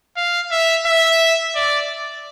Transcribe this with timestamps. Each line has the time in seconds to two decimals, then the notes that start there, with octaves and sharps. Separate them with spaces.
0.17 F5
0.51 E5
0.86 E5
1.55 D5